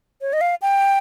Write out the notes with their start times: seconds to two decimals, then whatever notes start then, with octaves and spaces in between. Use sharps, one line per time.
0.21 C#5
0.33 D#5
0.41 F5
0.62 G5